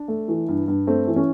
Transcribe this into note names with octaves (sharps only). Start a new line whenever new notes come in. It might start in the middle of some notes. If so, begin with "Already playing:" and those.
Already playing: D4
A3
E3
G2
G2
A3 C4
E3
C#4